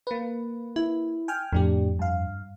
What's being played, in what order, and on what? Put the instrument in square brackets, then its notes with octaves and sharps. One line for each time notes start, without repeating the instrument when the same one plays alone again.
[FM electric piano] A#3 B4
[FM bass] E4
[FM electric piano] G5 G#5 F6
[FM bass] F2 [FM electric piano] A2 D4 G4
[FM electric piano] G2 F5